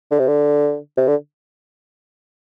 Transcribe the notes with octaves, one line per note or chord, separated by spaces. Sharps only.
D3
C3
D3
C3
D3